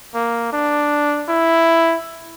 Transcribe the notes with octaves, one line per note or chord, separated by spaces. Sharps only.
A#3
D4
E4